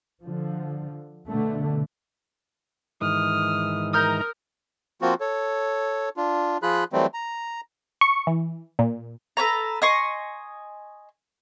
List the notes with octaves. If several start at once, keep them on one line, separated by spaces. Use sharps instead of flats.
D3 F3
B2 D3 A3
G#2 D#3 E3 D#6 F6
A#4 A#5 D#6 F6 G6
F3 A#3 C4 F4 F#4
A4 C#5
D4 F4
F3 F4 G#4 B5 F#6
E3 F#3 G3 A3 C4
A#5
C#6
E3
A#2
A4 B4 C#5 A#5
D#5 G#5 C6 C#6